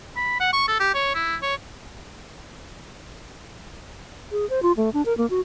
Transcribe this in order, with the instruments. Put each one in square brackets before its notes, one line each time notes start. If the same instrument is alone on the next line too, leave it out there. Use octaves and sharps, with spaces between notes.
[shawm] B5
F#5
C#6
A4
G4
C#5
E4
C#5
[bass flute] G#4
C5
F4
A3
D4
A#4
A#3
F#4